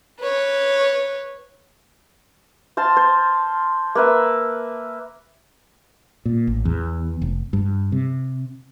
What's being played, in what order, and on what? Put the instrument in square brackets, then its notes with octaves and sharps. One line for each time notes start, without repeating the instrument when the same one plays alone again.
[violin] B4 C#5
[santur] C5 F5 A5 C6
C5
A#3 B4 E5
[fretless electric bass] A#2
A1
E2
F1
G2
C3